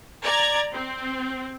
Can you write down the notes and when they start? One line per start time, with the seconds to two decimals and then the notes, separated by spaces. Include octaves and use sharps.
0.24 D5 A#5 G#6
0.73 C4